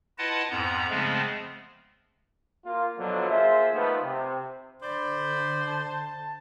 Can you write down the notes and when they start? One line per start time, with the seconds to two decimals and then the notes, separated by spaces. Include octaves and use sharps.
0.18 E4 F4 B4 D#5 F#5 A5
0.50 F2 G#2 B3 A#5
0.90 C#3 F3 G#3 A3 B3 C4
2.66 A#3 F4
2.98 B2 D3 F3 F#3
3.30 A#3 F4 G#4 C5 E5
3.73 D#3 F3 A3 B3
4.03 C3
4.82 D3 C5 D5 B5
5.68 A5